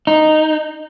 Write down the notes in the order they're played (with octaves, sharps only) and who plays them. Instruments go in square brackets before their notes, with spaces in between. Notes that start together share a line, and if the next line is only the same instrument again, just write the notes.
[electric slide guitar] D#4